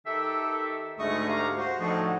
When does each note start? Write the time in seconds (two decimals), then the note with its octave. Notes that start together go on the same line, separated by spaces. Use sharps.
0.06 D#3 G4 A4 E5
0.99 D2 G#2 A3 D#5 C#6 D#6
1.29 G4 F5 A#5
1.58 F#4 C5
1.79 A2 D3 F3 D#4